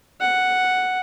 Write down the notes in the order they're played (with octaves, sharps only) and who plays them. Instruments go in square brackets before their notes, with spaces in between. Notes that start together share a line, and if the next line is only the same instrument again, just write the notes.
[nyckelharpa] F#5